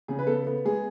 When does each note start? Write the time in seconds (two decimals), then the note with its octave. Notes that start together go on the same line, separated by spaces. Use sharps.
0.08 C#3 G#4
0.19 B4
0.27 B3 A4
0.47 B3
0.65 G#3 G#4